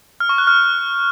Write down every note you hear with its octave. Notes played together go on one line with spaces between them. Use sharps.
F6
C#6
F#6
F6